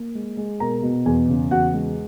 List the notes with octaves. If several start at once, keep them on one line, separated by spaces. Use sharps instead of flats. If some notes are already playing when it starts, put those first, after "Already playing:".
Already playing: A#3
G#3
G#3
B2 A#4 A#5
B2
E2 G#4 G#5
C#3
E2 F#4 F#5
G#3